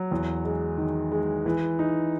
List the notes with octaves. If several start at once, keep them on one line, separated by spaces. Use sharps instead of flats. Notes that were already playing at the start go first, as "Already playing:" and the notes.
Already playing: F#3
E2
G#3
D#3
G#3
E3
D#4